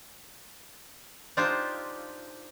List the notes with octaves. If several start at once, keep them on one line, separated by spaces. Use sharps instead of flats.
D4 D#4 F4 G4 C5